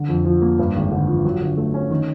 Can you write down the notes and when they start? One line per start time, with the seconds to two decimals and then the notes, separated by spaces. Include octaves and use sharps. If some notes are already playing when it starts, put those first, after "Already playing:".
Already playing: D3
0.09 F2
0.25 F3
0.42 A#3
0.59 G2
0.76 G#1
0.91 D3
1.08 F3
1.25 F#3
1.41 D3
1.57 A3
1.74 C#4
1.91 D#3